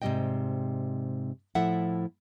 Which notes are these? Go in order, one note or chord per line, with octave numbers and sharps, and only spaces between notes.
G#2 C3 G3 C4 D#5 G5
A2 F3 E4 A4 E5 F#5